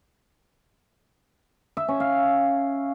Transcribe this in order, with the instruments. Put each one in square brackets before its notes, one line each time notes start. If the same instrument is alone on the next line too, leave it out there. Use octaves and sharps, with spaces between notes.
[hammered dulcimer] E5
C#4
F5